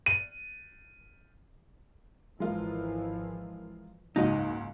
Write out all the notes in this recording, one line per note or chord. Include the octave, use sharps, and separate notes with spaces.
D#7
G#1 E3 F3 G#3 F4 A#4
F#1 C#2 G#2 D#4 F#4 D#5